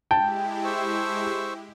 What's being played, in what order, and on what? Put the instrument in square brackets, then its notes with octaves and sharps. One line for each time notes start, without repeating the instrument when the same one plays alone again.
[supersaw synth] G#3 E4 G4 [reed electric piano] G5 [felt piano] A5
[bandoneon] C5 C#6 E6